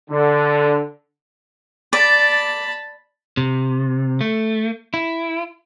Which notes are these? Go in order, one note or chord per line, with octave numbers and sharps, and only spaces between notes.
D3
D5 A5 B5
C3
A3
E4